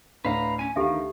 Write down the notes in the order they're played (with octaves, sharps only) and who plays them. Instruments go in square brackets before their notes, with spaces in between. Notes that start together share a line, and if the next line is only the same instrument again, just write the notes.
[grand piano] D2 A2 D5 [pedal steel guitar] B4 F5 A#5
[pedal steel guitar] C#4 G#5
[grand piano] D2 D3 F5 [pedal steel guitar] D#3 [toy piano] G4 A4 E5